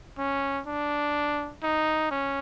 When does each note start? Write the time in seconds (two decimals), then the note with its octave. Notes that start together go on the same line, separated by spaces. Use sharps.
0.18 C#4
0.66 D4
1.63 D#4
2.11 C#4